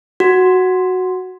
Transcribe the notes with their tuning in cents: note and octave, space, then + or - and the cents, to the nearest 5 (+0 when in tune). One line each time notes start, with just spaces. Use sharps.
F#4 +0